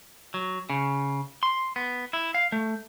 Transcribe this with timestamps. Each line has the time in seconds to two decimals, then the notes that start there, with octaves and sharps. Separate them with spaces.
0.34 F#3
0.70 C#3
1.43 C6
1.76 B3
2.13 E4
2.34 F5
2.52 A3